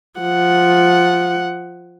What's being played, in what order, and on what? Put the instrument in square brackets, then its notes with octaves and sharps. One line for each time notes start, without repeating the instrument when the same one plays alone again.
[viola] F3 F#5